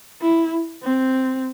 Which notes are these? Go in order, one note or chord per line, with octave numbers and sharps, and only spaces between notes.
E4
C4